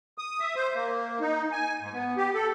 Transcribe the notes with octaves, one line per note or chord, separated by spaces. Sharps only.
D#6
E5
C5
A#3
D#4
G#5
G#2
B3
G4
A4